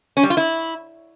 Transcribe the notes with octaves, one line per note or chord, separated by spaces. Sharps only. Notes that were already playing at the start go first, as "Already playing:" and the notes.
C#4
G3
F4
E4